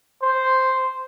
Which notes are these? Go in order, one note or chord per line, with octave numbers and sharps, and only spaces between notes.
C5